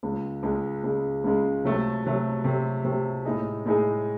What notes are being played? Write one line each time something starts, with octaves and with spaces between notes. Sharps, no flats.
C#2 C#3 G#3
C#2 C#3 G#3
C#2 C#3 G#3
C#2 C#3 G#3
C3 F#3 A3
C3 F#3 A3
C3 F#3 A3
C3 F#3 A3
A2 G#3 D#4 G#4
A2 G#3 D#4 G#4